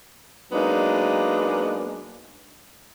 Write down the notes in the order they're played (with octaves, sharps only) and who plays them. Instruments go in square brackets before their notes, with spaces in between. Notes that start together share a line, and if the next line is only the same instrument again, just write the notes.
[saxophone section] F#3 G#3 A#3 B3 D4 D#4